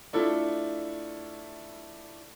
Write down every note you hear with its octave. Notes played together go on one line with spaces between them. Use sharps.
A3 D4 E4 F4 A4